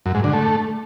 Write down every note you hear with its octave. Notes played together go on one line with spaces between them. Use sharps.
F#2
G#2
D3
A3